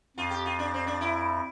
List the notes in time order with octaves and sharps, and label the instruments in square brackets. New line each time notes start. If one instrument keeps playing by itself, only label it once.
[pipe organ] F2 [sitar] F4
[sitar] G4
F4
D4
C4
D4
E4